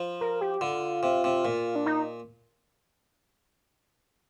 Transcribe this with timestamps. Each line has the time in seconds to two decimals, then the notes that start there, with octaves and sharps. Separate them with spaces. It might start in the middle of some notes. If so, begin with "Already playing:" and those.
Already playing: F3
0.21 A#4
0.41 G4
0.61 D3 F4
1.03 C3
1.24 C3
1.45 A#2
1.75 D4
1.86 D#4